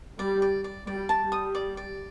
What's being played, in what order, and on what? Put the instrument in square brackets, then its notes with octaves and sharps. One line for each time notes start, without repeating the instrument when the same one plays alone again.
[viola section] G3 [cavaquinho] D5
[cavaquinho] D5
D5
[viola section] G3 [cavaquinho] D5
[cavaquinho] A5
[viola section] G3
[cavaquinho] D#6
D5
D5